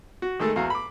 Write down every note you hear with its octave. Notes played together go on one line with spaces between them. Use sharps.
F#4
D#3 G#3 A3 A4
E2 F#4 F5 A#5
B5 D6